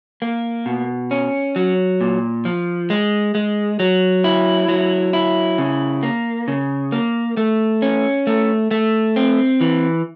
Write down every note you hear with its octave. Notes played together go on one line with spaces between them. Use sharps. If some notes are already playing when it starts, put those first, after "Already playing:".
A#3
B2
C#4
F#3
A#2
F3
G#3
G#3
F#3
E4
F#3
E4
C#3
A#3
C#3
A#3
A3
C#4
A3
A3
C4
E3